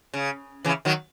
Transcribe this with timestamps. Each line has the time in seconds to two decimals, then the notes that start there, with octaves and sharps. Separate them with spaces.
0.14 C#3
0.65 C#3 E3
0.85 D#3 F#3